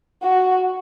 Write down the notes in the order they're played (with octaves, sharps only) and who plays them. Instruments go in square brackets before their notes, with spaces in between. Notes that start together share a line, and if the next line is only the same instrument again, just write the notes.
[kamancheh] F#4